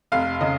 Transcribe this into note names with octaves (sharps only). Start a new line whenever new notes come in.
F1 F5
C#3 D#5